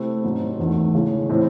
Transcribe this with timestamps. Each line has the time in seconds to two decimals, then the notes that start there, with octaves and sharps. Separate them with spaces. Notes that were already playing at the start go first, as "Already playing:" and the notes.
Already playing: C3 A3 C4 E4
0.24 G#2 F#3 C4 D#4
0.59 E2 D#3 A3
0.94 C#3 E3 G#3 C#4
1.29 A2 E3 G#3 C4